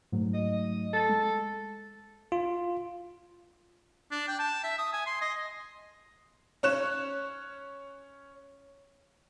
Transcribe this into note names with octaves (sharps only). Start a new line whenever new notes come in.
G#2 F#3 A3
D#5
A4
G#3
F4
D4
G5
A5
E5
D#6
G#5
C6
D#5
C#4 C#5 F#6 E7